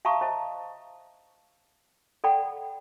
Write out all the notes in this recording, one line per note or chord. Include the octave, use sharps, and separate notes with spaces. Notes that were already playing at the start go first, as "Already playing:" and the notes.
E5 F5 A5 A#5 C#6 D#6
C5 D#5 A5
A4 D5 F#5 G5 B5